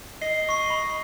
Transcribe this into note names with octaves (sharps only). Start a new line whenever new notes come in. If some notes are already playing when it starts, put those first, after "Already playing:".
D#5 C7
C#6 C7
B5